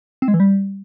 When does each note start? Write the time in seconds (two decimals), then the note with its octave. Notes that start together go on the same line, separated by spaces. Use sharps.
0.22 C4
0.28 G#3
0.34 E3
0.40 G3